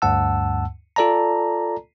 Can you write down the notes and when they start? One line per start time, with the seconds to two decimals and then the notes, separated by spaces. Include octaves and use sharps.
0.02 D2 G2 F#5 A5 E6
0.96 F4 A4 D5 A5 A#5